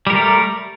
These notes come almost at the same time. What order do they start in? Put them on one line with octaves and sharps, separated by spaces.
G3 A#4 A3